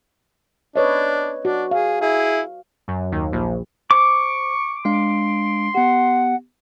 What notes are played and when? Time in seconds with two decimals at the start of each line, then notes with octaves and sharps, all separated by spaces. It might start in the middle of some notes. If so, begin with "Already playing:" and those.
0.76 D4 B4 C#5 D#5
1.45 D4 F#4
1.71 G#4 F5
2.01 E4 G#4
2.88 F#2
3.12 D#2
3.32 A#1
3.91 C5 C#6 D6
4.85 G#3 D4 F5 C6
5.75 B3 G4 F#5